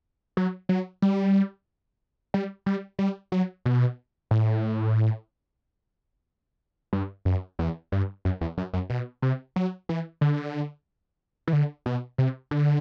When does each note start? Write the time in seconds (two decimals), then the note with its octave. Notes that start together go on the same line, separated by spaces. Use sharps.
0.37 F#3
0.69 F#3
1.02 G3
2.34 G3
2.66 G3
2.99 G3
3.32 F#3
3.65 B2
4.31 A2
6.93 G2
7.25 F#2
7.59 E2
7.92 G2
8.25 F#2
8.41 E2
8.57 F#2
8.74 F#2
8.90 B2
9.22 C3
9.56 F#3
9.89 E3
10.21 D3
11.48 E3
11.53 D3
11.86 B2
12.18 C3
12.51 D3